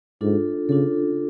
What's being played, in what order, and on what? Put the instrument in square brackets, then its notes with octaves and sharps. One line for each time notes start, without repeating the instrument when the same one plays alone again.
[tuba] G#2 [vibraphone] D4 F4 A4
[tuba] C#3 [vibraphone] D4 F4 A4